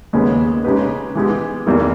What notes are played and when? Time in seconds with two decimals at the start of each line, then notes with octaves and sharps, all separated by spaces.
0.13 D#2 C#3 G#3 B3
0.64 C#3 G#3 D#4 G4 B4
1.15 E3 G#3 B3 G4
1.66 E2 D#3 G3 A#3 E4